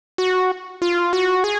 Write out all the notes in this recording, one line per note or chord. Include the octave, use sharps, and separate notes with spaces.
F#4
F4
F#4
G#4